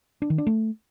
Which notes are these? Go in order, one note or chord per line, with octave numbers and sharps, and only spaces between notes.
D4
D#3
D4
A3